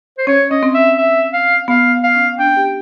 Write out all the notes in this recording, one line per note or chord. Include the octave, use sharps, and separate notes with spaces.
C5
C#4 C#5
C#4 D#5
C4
E5
E5
F5
B3 F5
F5
C#4
D4 G5
G4